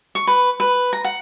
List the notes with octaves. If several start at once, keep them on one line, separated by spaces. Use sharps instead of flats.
C#6
B4
B4
A#5
F#5